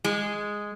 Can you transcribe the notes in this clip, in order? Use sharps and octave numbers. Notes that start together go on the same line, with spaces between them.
G#3